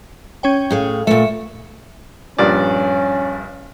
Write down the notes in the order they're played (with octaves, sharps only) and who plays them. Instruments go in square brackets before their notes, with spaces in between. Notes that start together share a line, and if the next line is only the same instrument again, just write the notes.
[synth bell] C#4 C#5 G5
[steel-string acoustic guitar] A2 G#4 F5
[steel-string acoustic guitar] A#2 A3 [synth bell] E5 C#7
[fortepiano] A#1 G2 D5 [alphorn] C#4